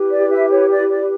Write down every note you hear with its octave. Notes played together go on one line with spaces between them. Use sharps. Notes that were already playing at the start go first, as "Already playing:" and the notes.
Already playing: E4 G4 B4
D5
E5
C#5
D5
D5